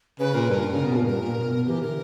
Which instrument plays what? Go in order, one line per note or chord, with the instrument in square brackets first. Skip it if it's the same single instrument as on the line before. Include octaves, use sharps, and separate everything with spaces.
[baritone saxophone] C#3 [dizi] B4
[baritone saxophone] A#2 [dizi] A#4
[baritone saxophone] G2
C#3
B2
A#2
[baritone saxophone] G2 [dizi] A#4
[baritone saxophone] A#2
B2
[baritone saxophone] E3 [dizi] G4
[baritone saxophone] D3 [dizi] A#4